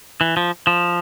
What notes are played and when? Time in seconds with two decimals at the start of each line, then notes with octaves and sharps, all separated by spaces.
0.21 E3
0.37 F3
0.67 F3